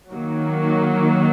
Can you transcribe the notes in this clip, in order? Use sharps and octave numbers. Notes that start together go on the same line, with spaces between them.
D#3 F#3 A#3